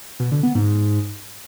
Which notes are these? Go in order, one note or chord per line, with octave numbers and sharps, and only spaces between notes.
B2
D3
B3
G#2